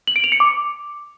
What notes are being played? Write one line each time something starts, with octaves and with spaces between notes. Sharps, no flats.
F#7
D7
F7
C#7
D6